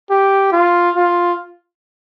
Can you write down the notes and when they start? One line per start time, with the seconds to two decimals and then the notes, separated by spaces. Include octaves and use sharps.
0.10 G4
0.52 F4
0.96 F4